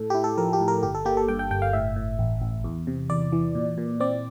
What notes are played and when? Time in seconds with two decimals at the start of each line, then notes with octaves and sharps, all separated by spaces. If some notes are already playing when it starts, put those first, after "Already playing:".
Already playing: A2 A4
0.10 E4 G4
0.24 A4
0.37 F3 A#4
0.53 G4
0.60 A2
0.68 A#4
0.83 G1 G4
0.94 A4
1.05 A#3 G4
1.17 A4
1.28 G2 G5
1.39 G5
1.51 G1 G5
1.62 F5
1.73 A2 E5
1.96 A2
2.19 A1
2.42 A1
2.64 E2
2.87 C3
3.10 E2 D5
3.32 E3
3.55 A#2
3.78 A#2
4.00 C4 D5